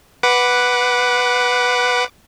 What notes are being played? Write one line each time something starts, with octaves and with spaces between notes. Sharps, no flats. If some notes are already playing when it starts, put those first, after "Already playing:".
B4 F#5 D6